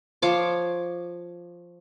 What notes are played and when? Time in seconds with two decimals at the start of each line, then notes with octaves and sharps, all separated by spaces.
0.22 F3 C#5 C6 D6